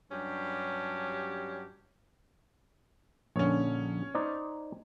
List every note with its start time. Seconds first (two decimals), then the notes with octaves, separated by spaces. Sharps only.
0.12 G2 F#3 C#4 D4 G4
3.36 A#1 D3 C#4 C#5
4.15 D#4 C5 D5